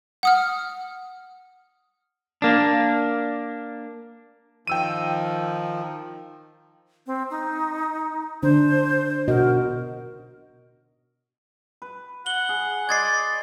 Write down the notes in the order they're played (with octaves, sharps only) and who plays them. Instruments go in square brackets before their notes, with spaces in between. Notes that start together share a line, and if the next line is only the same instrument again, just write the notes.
[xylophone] F#5 D#6 F6
[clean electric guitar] A#3 D4
[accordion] D#3 F3 [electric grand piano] G5 E6 D#7
[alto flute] C4
D#4
[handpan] D3 D4 [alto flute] C5
[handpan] B2 F#4 D#5 [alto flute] A#4
[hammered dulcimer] B4
[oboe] F#5 [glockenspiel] F#7 G7
[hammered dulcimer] G#4
[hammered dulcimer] C5 D#5 B5 [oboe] D5 [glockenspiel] G#6 A6 C7